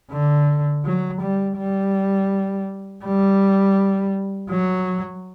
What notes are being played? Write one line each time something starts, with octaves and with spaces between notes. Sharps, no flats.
D3
F#3
G3
G3
G3
F#3